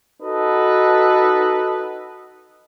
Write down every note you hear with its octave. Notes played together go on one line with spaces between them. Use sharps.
D#4 F#4 A4 B4 D#5